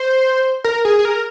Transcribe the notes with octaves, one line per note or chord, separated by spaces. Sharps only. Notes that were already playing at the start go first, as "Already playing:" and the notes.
Already playing: C5
A#4
G#4
G#4
A#4